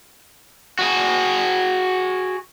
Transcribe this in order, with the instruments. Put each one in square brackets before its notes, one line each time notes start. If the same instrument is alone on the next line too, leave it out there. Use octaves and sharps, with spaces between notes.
[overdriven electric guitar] F#4 G#4